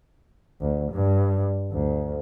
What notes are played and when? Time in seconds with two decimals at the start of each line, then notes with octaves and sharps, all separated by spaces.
0.61 D2
0.92 G2
1.72 D2